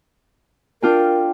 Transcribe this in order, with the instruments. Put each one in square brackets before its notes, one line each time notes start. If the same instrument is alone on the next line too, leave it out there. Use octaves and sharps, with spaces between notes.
[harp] D4 F4 G5 [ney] A#4